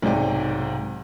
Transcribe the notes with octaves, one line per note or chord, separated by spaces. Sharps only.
B1 G#2 C3 D5 G5